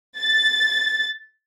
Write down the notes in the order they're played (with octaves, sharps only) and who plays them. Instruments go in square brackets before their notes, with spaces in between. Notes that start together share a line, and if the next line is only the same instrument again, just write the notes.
[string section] A6